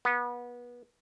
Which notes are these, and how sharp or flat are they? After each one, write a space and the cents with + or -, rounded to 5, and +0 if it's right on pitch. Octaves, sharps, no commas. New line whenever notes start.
B3 -25